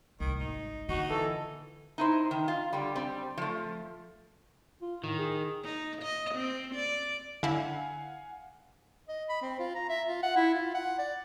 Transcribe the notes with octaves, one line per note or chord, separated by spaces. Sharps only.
C2 D#3
G#1 D#4
D3 D#4 F#4
A#2 E3 A4
D#4 E4 C5
D#3
F4
D3 G3
G3 C4
F3 A3
F4
A2 D#3
G#4
D#4
D#5
C4
D5
D3 E4 F5 F#5 G#5
D#5
B5
C4
F4
A#5
E5
F4
F#5
E4
F4
F#5
D5